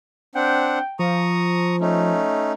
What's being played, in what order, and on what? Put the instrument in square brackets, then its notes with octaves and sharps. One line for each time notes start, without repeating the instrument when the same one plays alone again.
[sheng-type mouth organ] C4 D4 F#5 [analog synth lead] G5
[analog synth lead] F3 [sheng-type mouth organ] A#5 C#6 D#6
[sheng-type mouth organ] A3 C#4 D#4